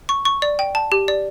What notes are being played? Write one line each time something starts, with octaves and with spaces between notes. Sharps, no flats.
C#6
C#6
D5
G5
A5
G4
D5